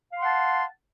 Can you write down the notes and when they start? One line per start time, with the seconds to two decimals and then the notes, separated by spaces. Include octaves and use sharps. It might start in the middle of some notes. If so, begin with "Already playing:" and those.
0.12 F5
0.16 C6
0.21 F#5
0.25 A5